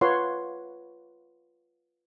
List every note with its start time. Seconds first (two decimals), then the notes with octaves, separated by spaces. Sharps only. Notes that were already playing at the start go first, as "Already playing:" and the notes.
0.01 F4 B4 C#5 F#5 C6